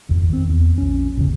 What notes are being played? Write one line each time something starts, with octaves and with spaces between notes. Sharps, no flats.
D#1 G#1 F2
D#3 C4
E2
A#1 C#4
G1 D#2 C#3